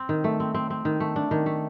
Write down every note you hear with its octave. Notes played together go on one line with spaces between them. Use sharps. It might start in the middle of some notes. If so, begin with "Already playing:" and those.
Already playing: C4
D#3
A3
C4
C4
C4
D#3
A3
D4
D#3
A3